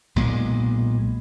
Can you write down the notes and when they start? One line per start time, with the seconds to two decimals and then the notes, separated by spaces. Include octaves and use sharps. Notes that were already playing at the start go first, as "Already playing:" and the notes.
0.16 B1 A#2 G#3